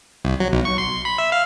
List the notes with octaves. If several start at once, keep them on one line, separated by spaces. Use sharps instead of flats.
C2
F#3
B1
C#6
C6
B5
E5
F5